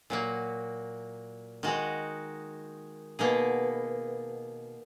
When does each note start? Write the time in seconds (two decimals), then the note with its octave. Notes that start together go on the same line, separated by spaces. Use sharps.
0.10 A#2 F#3 A#3
1.63 D#3 G#3 D#4 F#4
3.19 B2 A#3 D#4 G#4